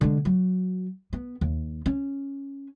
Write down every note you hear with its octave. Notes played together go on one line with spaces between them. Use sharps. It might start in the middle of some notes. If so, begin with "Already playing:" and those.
D3 G#3
F#3
B3
D#2
C#4